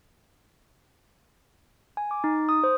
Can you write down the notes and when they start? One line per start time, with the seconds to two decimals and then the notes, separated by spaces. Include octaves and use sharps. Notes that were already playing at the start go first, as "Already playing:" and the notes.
1.97 G#5
2.11 D6
2.24 D#4
2.49 D#6
2.64 C5